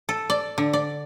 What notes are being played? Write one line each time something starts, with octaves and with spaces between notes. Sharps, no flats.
A4
D5
D3
D5